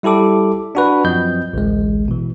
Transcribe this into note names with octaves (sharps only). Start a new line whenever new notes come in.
G3 E4 G4 A4 D6
D4 F#4 B4
F#2 F3 C4 D#5 G6
A1 D2 G#3
B2 E3